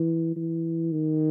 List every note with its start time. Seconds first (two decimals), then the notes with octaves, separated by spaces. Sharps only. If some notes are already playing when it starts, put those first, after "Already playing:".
Already playing: E3
0.36 E3
0.91 D#3